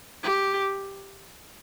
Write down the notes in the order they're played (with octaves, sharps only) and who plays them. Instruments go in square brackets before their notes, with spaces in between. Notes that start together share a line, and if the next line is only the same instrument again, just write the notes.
[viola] G4